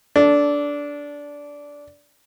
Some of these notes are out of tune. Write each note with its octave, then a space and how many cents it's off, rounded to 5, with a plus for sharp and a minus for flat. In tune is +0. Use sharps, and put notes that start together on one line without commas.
D4 -15 A4 +0